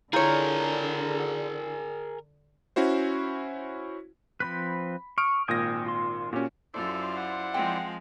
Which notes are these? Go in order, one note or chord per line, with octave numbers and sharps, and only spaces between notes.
D3 E4 F4 G#4 A#4 C#5 A#5 G6
C#4 E4 F#4 C5
F3 C4 B4 B5
C#6 D#6 F6 D7
G#1 A#2 G5 G#5 D#6 A#6
F4 C6
A#2 C#4 F#4 G4
F#2 E4 F4 A4 C5 D5
F#5
F3 G#3 C4 G5